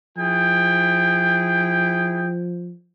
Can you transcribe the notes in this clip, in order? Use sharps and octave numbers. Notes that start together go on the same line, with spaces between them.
F3 E4 G#4 G5